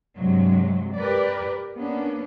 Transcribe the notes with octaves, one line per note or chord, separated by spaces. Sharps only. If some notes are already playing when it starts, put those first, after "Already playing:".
G2 C3 F#3 G#3
G4 A#4 B4 D5
A#3 B3 C#4 D4